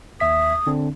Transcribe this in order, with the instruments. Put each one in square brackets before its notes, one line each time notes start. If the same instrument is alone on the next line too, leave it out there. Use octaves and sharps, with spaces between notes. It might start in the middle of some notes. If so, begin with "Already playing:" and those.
[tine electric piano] D#2 E5 B6 [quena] D#6
[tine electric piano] D3 C4 D4